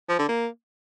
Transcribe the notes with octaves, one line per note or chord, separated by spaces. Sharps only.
F3
D3
A#3